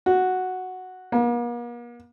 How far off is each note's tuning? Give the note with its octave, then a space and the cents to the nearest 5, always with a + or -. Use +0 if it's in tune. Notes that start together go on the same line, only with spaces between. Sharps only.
F#4 +0
A#3 +45